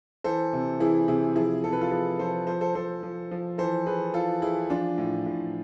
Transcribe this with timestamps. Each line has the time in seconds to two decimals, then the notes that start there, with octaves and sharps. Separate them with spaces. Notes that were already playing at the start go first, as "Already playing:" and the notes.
0.24 E3 A4 C5
0.53 C3
0.80 E3 E4 G#4
1.08 C3 E4 G#4
1.35 F3 E4 G#4
1.64 C3 A4
1.73 B4
1.81 F4 A4
1.91 F3 G#4 B4
2.19 F3 A4 C5
2.47 F3 A4 C5
2.61 A4 C5
2.75 F3 A4 C5
3.03 F3
3.31 F3
3.58 E3 A4 C5
3.86 E3 G#4 B4
4.14 E3 F4 A4
4.42 E3 E4 G#4
4.70 F3 D4 F4
4.98 A2
5.26 A2